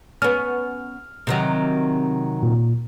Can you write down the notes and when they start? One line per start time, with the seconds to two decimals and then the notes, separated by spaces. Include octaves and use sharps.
0.22 B3 C#4 F6
1.27 C3 D#3 F#3
2.43 A#2